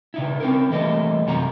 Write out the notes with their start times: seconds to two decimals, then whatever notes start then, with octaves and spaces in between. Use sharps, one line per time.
0.14 C#3 D#4 E4
0.40 C4 C#4 A#4
0.70 E3 G3 A3 A#3 D#5
1.26 F#2 C3 F#5 A#5